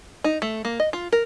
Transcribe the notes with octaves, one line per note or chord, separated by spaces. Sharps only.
D#4
A3
A#3
D#5
F4
A#4